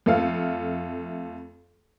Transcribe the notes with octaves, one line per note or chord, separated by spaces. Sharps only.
F2 A3 F5